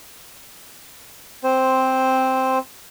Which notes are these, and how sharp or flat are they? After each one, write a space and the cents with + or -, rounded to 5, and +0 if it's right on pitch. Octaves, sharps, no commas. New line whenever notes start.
C4 +0 C5 +0